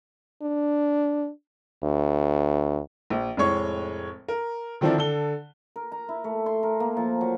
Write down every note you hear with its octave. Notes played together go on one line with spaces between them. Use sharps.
D4
D2
A#1
F1 A2 G#3 C#5 C#6
A#4
D3 D#3 F3 C4 D4 E4
D3 A4 G7
A#4
A#5
E4
A3
C6
A#4
A#3
F3
F#3